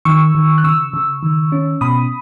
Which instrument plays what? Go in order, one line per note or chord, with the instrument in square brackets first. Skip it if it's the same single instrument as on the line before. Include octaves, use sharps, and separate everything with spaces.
[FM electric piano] D#3 C#6 E6
D#3
F#6
C#3 C#6 E6
C#3
D#3
C#4
B2 B5 D#6